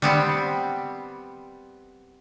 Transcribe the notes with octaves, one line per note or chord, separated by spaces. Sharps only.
G3 B3 C4